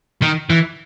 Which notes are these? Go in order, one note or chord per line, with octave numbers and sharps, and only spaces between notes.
D#3
E3